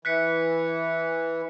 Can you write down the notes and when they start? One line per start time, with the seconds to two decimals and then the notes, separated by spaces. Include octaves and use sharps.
0.05 E3 F#6 B6 C#7